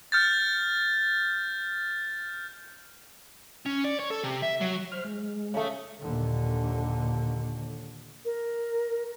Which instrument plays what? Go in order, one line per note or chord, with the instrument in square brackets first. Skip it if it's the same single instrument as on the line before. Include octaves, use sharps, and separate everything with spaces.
[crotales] F6 G6 A6
[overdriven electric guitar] C#4
D5
C#5
A4
C3
E5
F#3
[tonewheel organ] C5 F6
G#3
[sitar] C#3 A3
[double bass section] D#2 A#2 D3
[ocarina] A#4